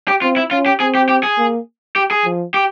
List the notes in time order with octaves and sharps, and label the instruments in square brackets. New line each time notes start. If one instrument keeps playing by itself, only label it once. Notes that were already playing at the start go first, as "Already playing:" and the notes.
[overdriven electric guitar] G4
[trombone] C4 [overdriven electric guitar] F4
[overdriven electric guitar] E4
[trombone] C#4 [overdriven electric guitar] F4
[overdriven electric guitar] G4
[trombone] C4 [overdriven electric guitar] G#4
[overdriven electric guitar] G4
G4
G#4
[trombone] A#3
[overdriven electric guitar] G4
G#4
[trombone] F3
[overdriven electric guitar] G4